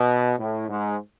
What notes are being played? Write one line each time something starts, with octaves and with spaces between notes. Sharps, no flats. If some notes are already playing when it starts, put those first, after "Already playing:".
Already playing: B2
A2
G#2